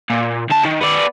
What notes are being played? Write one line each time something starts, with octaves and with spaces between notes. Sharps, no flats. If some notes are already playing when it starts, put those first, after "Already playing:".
A#2
D2 A5
D#3
B3 D5